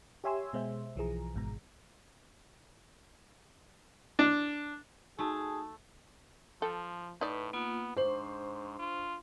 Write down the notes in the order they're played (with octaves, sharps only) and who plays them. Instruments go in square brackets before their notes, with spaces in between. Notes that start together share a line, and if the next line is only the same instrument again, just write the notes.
[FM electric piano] G4 C#5 E5 G#5 C6 E6
B2 G#3 C5 E5
B1 E3 F3 G#4 A#5
G#1 G#2 B2 A#5
[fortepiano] D4
[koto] A3 [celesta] D#4 F#4 A5 [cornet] G#4
[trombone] F3 [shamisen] A4 G5
[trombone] A2 [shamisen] D#4 D5 [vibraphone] B4
[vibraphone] A#3 F4 [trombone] B3
[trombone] G#2 [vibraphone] D4 C6 C#6 [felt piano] C5
[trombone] F4